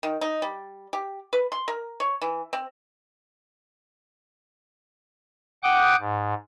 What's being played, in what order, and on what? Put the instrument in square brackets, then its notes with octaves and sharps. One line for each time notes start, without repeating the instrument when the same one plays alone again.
[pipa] D#3
D#4
G3
G4
B4
C6
A#4
C#5
E3
C4
[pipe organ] F#5 G5 D6 D#6 F#6 G6
G#2